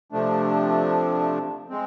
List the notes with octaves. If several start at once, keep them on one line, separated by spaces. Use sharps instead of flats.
C3 F3 A3 D4
G#3 C4